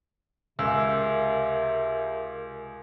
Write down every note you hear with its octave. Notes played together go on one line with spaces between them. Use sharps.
C#2 C3 A#4 D6 E6